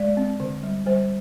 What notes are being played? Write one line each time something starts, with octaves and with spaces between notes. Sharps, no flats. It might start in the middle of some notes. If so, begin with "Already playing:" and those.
Already playing: G#3 D5
C4
D3
G3
G3 C5